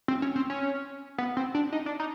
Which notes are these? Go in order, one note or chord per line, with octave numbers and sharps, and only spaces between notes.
C4
C#4
C4
C#4
B3
C4
D4
D#4
D4
D#4